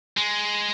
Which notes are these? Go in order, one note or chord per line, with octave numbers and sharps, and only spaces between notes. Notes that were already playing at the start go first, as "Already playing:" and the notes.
G#3